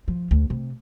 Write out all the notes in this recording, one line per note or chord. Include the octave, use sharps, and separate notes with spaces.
F3
D2
C3